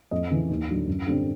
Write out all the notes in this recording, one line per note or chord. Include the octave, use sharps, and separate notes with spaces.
F2 D#5
C#3 E3
D#2
D3 F#3
F#2
D3 G3 C4